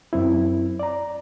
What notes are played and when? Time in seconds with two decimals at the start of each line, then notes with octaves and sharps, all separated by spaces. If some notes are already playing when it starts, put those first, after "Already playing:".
0.13 F#2 C4 E4
0.79 D5 A#5